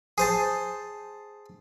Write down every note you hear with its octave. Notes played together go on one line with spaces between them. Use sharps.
G#4 C5 A5